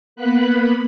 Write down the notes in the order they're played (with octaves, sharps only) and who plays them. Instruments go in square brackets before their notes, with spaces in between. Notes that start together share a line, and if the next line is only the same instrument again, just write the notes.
[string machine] A#3 B3 B5 F#6